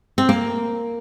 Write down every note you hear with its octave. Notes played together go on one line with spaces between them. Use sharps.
C4
A#3